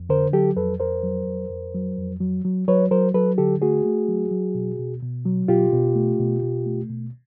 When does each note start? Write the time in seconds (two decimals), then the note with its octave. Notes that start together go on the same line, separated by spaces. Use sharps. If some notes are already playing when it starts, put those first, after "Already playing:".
Already playing: F2
0.09 D3 A#4 C5
0.33 F#3 G4 A4
0.57 F2 A4 B4
0.80 F2 A#4 C5
1.03 F#3
1.27 F2
1.50 F2
1.74 F#3
1.98 F2
2.21 F#3
2.44 F#3
2.68 F#3 B4 C#5
2.91 F#3 A#4 C5
3.14 F#3 A4 B4
3.38 D3 G4 A4
3.62 A3 F#4 G#4
3.85 A3
4.08 F#3
4.31 F#3
4.55 B2
4.79 B2
5.03 B2
5.26 F#3
5.48 B2 F4 G4
5.73 B2
5.96 A3
6.20 B2
6.43 B2
6.66 A3
6.89 B2